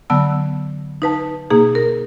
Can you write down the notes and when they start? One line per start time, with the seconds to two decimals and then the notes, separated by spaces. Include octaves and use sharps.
0.10 D3 F#3 B3 A5 E6
1.02 D#4 B4 A5
1.50 B2 A#3 D#4 G#4
1.75 A#4